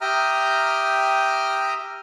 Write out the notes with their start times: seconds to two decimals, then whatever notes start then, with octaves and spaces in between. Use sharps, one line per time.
0.01 G4 E5 G5 A#5 D#6 F6